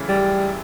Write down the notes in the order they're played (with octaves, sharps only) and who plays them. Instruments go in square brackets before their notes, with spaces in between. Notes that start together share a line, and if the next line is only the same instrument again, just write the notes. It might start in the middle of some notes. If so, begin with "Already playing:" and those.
Already playing: [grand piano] F#2 C#3 E3 A3
[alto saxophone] G3